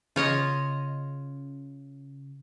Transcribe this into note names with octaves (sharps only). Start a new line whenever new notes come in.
C#3 F4 C#5 D#5